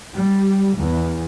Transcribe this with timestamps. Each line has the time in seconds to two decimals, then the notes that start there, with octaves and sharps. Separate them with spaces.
0.14 G3
0.78 E2